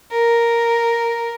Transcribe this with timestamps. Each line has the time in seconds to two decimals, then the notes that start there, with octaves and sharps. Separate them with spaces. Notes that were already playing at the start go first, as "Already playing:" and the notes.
0.11 A#4